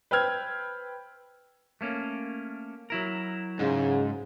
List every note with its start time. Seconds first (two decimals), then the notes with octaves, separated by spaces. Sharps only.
0.11 B4 C5 G5 E6 F6 G#6
1.81 A3 A#3 C#4
2.90 F#3 E4 A#4
3.59 G#2 C#3